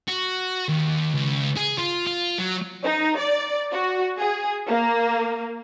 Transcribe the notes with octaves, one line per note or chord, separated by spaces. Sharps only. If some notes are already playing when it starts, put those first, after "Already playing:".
F#4
D#2
C#2
G#4
F4
F4
F#3
D#4
D5
F#4
G#4
A#3